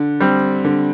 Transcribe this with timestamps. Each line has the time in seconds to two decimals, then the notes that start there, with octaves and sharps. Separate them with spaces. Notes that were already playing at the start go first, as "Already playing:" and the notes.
Already playing: D3
0.21 G3 C4
0.65 D3